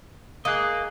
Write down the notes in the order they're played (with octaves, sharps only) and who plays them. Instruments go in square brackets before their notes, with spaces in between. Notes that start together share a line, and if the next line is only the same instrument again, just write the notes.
[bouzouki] A#3 [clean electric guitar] G#4 D#5 [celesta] D#6 F#6